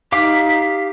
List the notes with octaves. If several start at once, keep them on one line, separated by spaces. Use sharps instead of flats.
D#4 G4 F5 D6 B6